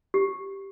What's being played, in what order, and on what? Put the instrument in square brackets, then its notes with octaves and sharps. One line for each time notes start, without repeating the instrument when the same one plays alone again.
[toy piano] G4